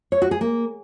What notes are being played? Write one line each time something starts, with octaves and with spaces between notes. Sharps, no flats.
C#5
F#4
G#4
A#3